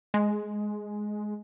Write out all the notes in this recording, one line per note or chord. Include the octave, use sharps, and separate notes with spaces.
G#3